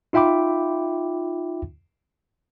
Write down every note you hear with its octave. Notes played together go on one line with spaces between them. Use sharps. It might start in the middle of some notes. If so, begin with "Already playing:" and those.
D#4 F4 E5 G5 B5 D6